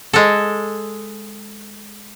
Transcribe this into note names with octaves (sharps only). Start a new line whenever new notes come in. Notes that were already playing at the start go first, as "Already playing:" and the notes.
G#3 A4